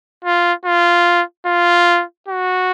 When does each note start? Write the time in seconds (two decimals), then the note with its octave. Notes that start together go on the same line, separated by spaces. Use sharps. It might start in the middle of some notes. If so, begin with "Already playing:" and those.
0.24 F4
0.65 F4
1.46 F4
2.28 F#4